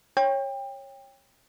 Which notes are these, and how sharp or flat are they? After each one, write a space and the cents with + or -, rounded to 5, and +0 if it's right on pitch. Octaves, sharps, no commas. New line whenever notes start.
C#5 -15 G5 +25